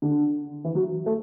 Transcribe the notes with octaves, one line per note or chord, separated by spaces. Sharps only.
D3
E3
F#3
A3